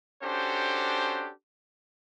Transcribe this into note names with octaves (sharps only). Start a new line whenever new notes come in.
C#4 D4 F#4 G4 A4 C5